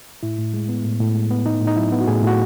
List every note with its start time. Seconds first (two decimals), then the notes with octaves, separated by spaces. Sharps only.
0.23 A2 E4
0.39 A2
0.54 G#3
0.69 B3
0.85 A2
1.00 A2
1.15 G#3
1.30 B3
1.46 A2 D#4
1.62 A2
1.67 D#4
1.76 F#3 E4
1.92 B3
2.00 F#4
2.08 A2 G#4
2.23 A2 F#4